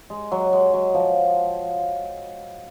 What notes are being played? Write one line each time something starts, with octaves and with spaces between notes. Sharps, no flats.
G#3
F#3
G#3
F#3
F3